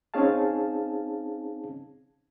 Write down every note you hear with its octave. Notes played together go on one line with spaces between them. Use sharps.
C4 C#4 D#4 G#4 F5 A5